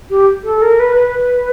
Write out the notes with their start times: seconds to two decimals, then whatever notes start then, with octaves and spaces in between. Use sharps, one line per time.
0.10 G4
0.44 A4
0.62 A#4
0.80 B4
0.96 B4